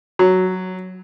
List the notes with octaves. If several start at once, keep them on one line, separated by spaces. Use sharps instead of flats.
F#3